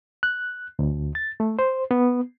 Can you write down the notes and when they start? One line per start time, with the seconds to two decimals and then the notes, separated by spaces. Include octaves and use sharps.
0.23 F#6
0.79 D2
1.15 A6
1.40 A3
1.59 C5
1.91 B3